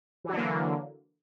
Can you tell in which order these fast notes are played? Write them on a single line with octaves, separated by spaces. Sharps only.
E3 F#3 D3 A#3